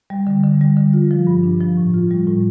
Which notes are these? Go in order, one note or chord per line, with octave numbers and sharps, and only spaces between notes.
G3
D3
D3
G3
D3
F4
F3
G2
D4
F3
A2
F4
G3
A2